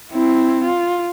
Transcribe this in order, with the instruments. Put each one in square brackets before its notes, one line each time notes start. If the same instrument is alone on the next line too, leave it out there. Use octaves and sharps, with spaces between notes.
[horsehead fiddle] C4 E4
F4